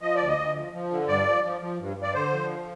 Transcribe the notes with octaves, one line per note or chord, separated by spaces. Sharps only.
F3 D#5
D2 D5
D#5
D2
F3
F3
D3
G2 D5
F3
F3
F3
G2
G2
D5
D3 C5
F3